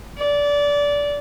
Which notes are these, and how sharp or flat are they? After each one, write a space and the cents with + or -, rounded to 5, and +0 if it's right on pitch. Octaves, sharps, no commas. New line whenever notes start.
D5 -20